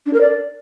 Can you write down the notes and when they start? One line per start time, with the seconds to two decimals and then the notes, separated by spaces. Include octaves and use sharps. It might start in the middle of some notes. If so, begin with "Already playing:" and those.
0.06 D4
0.13 A#4
0.21 D5